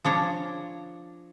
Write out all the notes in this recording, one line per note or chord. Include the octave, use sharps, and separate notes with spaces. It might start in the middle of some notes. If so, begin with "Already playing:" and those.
F3 D4 C#5 A#5